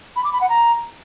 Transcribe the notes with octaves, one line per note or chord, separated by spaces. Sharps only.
B5
D6
B5
F#5
A#5